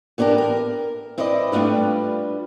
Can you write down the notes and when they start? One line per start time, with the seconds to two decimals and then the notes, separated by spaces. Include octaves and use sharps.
0.18 E3 B3 D4 G4 A#4
0.38 A#4
1.18 C4 E4 B4 D5 D#5
1.52 G3 A3 D4 F4 B4